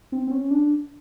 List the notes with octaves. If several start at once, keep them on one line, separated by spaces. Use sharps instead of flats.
C4
C4
C#4
D4